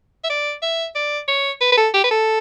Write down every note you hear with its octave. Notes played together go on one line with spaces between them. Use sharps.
E5
D5
E5
D5
C#5
B4
B4
A4
G4
B4
A4